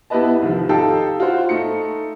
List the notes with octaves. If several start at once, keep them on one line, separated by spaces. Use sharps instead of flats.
B3 E4 G4 B4 D#5 A5
C2 D#3 F3
D#4 G4 A4 F5 G5 A5
F4 F#4 C5
A3 D#4 C#7